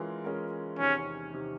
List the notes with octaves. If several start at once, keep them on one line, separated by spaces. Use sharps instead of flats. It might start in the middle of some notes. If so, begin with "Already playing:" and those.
Already playing: E3 G#3 C#4 F4 A#4
E3 G#3 C#4 F4 A#4
E2 C3 D#3 C#4
C3 D#3